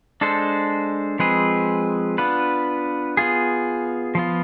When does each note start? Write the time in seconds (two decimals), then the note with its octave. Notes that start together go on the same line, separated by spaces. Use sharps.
0.21 G#3 D4 A4 C5
1.19 F3 G#3 C4 G#4 B4
2.18 B3 D4 F4 B4
3.17 B3 F4 G#4
4.15 F3 B3 F4